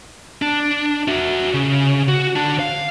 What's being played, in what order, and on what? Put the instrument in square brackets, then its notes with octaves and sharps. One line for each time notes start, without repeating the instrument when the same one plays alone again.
[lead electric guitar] D4
F#4 E5
C#3
F#4
D3 D4
F5